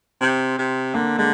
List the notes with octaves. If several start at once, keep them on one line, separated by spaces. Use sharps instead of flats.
C3 C4
C3
D3 A#3
D3 G#3